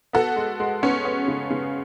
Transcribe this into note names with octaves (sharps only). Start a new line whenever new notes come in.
B3 F#4 A4
G#3
G#3
B3 C#4
B3
C#3
C#3